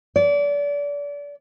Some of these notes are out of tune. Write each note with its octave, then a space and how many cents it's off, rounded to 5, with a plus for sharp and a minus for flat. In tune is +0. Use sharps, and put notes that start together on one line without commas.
D5 -30